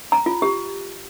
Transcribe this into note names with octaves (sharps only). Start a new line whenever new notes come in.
A#5
F4
G4